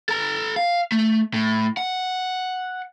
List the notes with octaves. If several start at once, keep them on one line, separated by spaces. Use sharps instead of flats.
A4 A#5
F5
A3
A2
F#5